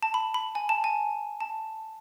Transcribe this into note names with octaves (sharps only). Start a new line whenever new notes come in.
A5
B5
B5
G#5
A5
G#5
A5